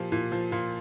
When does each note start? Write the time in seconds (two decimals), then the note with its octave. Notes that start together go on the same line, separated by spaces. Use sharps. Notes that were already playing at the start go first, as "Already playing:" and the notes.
Already playing: A#2 F3 G4
0.12 A#2
0.32 F3
0.52 A#2